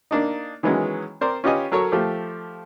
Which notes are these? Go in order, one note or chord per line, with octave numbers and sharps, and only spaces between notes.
A#3 D4 D#4
D#3 E3 F#3 G#3 B3 C#4
C4 A#4 C5 D5
C#4 F4 G4 B4 D#5 G#5
F#3 A4 A#4 C#5
F3 A3 G4